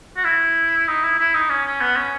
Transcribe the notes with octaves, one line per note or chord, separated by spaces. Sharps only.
F#4
E4
D#4
E4
E4
D#4
C#4
C#4
B3
C#4